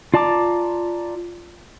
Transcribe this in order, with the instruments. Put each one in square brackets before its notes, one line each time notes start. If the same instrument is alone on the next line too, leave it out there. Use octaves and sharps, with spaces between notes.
[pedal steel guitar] F4 D5 A5 A#5 D6